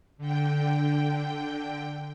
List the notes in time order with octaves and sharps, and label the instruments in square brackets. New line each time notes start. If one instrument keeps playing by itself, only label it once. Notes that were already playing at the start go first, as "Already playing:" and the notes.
[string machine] D3 G5